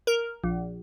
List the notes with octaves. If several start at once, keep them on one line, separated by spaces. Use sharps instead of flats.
A#4
A#1